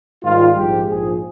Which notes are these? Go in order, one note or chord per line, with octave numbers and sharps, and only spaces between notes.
G#2 D#3 G3 F4
A#1 G#2 F3 G#3 G4
A#1 G#2 F3 G#4